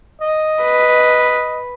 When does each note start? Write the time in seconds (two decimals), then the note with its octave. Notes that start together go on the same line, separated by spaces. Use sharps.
0.21 D#5
0.63 B4